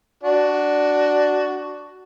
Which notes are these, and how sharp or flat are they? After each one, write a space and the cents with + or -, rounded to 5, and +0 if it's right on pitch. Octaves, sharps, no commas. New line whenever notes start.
D4 +0 F#4 +10